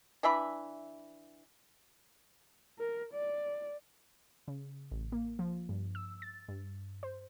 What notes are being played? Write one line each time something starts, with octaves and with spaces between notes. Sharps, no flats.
E3 D4 E5 B5
A#4
D5
C#3
A1
A#3
F3
G2
E6
A6
G2
C5